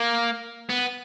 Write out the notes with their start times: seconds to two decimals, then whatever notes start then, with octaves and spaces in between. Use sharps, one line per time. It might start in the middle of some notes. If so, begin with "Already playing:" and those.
Already playing: A#3
0.70 B3